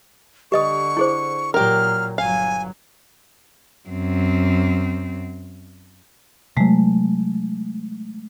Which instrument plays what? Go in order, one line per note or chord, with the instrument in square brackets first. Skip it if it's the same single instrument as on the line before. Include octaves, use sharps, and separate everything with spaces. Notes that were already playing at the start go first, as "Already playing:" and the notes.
[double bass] D3 [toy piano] G4 D#5 D#6 [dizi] C#6
[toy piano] E4 G#4 C5
[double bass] A#2 F#3 [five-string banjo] G4 A#4 [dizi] F6
[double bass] G1 F#3 [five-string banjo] F5 [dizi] G#5
[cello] F#2 C4
[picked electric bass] C3 F#3 [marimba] G#3 A3